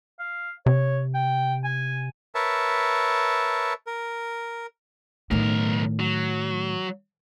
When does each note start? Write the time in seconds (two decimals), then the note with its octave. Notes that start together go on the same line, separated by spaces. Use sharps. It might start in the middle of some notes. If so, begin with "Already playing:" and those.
0.19 F5
0.66 C3 C#5
1.14 G5
1.64 G#5
2.35 A#4 B4 C#5 E5 A5
3.87 A#4
5.31 B1 A2 D#3 A#4
6.00 F#3